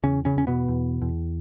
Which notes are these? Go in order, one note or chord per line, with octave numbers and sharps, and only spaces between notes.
E2 C#3 C#4
C#3 C#4
E2 C#4
B2 B3
E2
E2